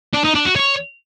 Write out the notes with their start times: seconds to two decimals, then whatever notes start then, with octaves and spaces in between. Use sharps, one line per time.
0.14 D4
0.24 D#4
0.35 D4
0.45 F#4
0.56 C#5